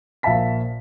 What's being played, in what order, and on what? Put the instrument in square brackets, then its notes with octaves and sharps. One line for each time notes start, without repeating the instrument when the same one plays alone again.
[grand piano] A#1 A#2 E5 F5 A5 B6